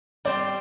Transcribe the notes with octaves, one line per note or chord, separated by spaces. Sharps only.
G3 C4 G4 D5